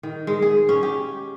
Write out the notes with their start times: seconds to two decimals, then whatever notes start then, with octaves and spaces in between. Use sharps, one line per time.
0.03 D#3
0.27 G#3
0.42 G#4
0.69 C#4
0.83 G4